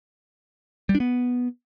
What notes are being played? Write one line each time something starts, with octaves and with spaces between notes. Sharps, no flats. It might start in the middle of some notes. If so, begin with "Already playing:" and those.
G3
D4
B3